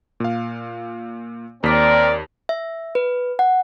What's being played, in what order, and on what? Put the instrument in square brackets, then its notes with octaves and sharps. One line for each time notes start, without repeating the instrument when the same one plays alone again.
[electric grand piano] A#2 F5
[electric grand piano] D#2 B6 [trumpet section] C4 A#4 D5
[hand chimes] E5
B4
F#5